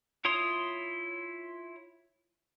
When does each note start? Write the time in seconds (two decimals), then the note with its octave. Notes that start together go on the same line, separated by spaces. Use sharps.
0.25 E4 F4 C#5 C6 D#6